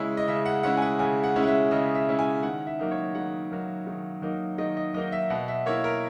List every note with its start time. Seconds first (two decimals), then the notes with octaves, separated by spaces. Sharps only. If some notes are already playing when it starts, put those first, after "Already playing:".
Already playing: C#3 G#3 C#4 E4
0.17 D#5
0.28 C#3 E5
0.46 F#5
0.63 G#3 C#4 E4 F#5
0.77 G#5
0.82 F#5
0.99 C#3 G#5
1.24 F#5
1.36 G#3 C#4 E4
1.43 F#5
1.47 E5
1.71 C#3 D#5
1.95 E5
2.07 G#3 C#4 E4
2.19 G#5
2.43 D#3 F#5
2.67 E5
2.79 F#3 A#3 D#4
2.91 C#5
3.15 D#3 F#5
3.51 F#3 A#3 D#4
3.87 D#3
4.22 F#3 A#3 D#4
4.58 D#3 D#5
4.77 D#5
4.94 F#3 A#3 D#4 D#5
5.12 E5
5.30 B2 F#5
5.48 E5
5.66 A#3 E4 C#5
5.84 A#4